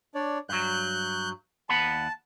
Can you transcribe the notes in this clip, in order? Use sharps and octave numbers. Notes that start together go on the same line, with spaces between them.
D4 C#5 D5
G2 F#3 F#6 G6
D#2 F#5 A5 B5